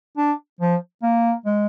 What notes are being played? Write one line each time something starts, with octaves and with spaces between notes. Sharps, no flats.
D4
F3
A#3
G#3